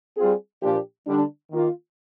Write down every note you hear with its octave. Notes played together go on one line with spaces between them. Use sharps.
G3 C4 F4 G#4
A#2 F3 A#3 D4 G4
D3 G3 D4
D#3 A#3 F4